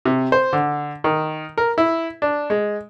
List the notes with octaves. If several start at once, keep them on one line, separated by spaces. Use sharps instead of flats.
C3
C5
D3
D#3
A#4
E4
D4
G#3